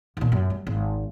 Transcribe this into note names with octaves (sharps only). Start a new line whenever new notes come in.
D#2 A#2
F#2
G3
G#1